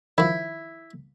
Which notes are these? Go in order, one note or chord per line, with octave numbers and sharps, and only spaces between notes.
D#3 F3 E4